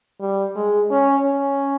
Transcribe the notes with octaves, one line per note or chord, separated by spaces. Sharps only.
G3
G#3
C#4
C#4